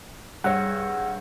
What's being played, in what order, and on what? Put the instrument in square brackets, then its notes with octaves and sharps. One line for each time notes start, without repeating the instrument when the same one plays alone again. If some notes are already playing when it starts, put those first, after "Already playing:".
[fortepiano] G2 C#5 [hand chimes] G#4 E6 A#6 [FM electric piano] F#5